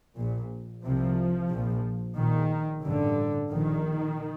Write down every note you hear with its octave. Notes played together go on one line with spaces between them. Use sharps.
A#1 A#2
C2 C3 F3
A#1 A#2
A#1 A#2 D#3
A1 G2 D3
A#1 A#2 D#3